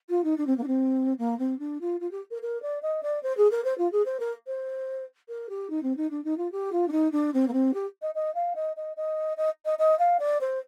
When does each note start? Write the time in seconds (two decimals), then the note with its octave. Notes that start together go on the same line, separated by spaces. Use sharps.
0.09 F4
0.24 D#4
0.38 D4
0.47 C4
0.57 A#3
0.63 D4
0.67 C4
1.18 A#3
1.39 C4
1.59 D4
1.81 F4
2.00 F4
2.11 G4
2.31 A#4
2.42 A#4
2.62 D5
2.82 D#5
3.03 D5
3.23 C5
3.37 G#4
3.51 A#4
3.64 C5
3.78 F4
3.92 G#4
4.05 C5
4.20 A#4
4.47 C5
5.28 A#4
5.49 G4
5.70 D#4
5.83 C4
5.97 D#4
6.11 D4
6.24 D#4
6.38 F4
6.52 G4
6.72 F4
6.88 D4
6.92 D#4
7.12 D4
7.34 C4
7.48 A#3
7.53 C4
7.74 G4
8.02 D#5
8.15 D#5
8.35 F5
8.55 D#5
8.76 D#5
8.97 D#5
9.37 D#5
9.65 D#5
9.79 D#5
9.99 F5
10.20 D5
10.41 C5